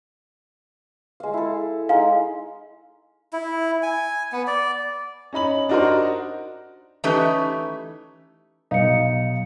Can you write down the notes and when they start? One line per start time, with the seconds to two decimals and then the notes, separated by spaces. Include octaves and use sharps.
1.20 G#3 F5
1.34 E4 A4
1.89 G#3 D#4 F5
3.33 E4
3.83 G#5
4.32 B3
4.47 D5
5.33 C#4 D#4 B5 F#7
5.69 D4 D#4 F#4 A#4 C5
7.04 E3 A3 C#4 D#4 G4 B4
8.71 B1 D#4 F5 C#7